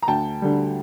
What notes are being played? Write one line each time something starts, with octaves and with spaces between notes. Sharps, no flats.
A#5
D2 G5 A5
D3 G3